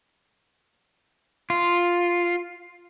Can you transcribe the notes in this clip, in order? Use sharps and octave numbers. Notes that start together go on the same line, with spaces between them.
F4